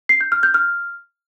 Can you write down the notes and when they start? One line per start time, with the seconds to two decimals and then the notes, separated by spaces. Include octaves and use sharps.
0.09 C7
0.21 G6
0.32 F6
0.43 G6
0.54 F6